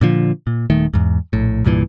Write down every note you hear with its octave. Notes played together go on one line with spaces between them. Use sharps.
A#2 D3 F3
A#2
D#1 D#3 A3
E2 G#2
A#1 A2
C2 G2 A#2 E3